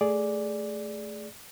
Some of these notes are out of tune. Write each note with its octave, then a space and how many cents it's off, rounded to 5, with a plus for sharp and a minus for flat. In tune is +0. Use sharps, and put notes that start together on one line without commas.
A3 -5 G#4 +0 D5 +0